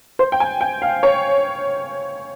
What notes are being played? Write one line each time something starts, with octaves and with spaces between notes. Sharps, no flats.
C5
G5
G#5
G5
F5
C#5